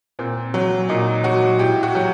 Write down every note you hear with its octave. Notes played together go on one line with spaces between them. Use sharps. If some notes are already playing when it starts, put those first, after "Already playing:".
A#2 C4
F#3
A#2 D#4
F#3 F#4
A2 G4
F#4
F#3 G4